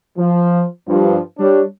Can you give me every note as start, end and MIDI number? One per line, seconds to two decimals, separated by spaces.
0.18 0.64 53
0.88 1.19 43
0.88 1.19 53
1.38 1.62 55
1.38 1.62 62
1.38 1.62 73